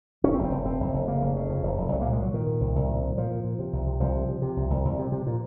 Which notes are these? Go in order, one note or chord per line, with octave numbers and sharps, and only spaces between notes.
F1 C#4
C4
F1
C4
F1
F1 C4
F1
F1
C#3 A#3
F1
C#3
F2
F1
F1
C2 F#3
A#2 A#3
G#3
A#2 F#3
A#2 D#3
A#2
C2
C2
A#2
A#2
A#2 F3
A#2
A#2
C3
C2
C3
C2 F3
C3
C3
C3
C2
C2
C2
C3
C3
A#2